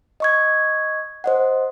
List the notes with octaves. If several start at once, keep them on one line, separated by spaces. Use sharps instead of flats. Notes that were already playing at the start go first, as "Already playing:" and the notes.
D#5 C#6 G#6
C5 D#5 F#5